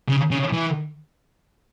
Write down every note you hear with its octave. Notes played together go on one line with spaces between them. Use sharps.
C#3
C#3
E3